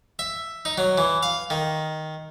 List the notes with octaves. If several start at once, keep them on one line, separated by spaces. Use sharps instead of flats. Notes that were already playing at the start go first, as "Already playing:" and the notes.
E5
D#4
F#3
E3
F5
D#3